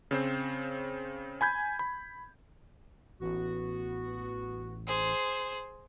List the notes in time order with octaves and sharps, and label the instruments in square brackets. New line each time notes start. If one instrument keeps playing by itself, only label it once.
[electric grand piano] C#3 C4 C5
G#5 B5 G6 G#6
B5
[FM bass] A1 [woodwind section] B3 F#4
[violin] G#4 C5